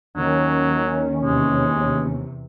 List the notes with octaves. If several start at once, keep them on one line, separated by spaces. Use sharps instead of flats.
D#2 D#3 F#3 C#4
E2 C3 G#3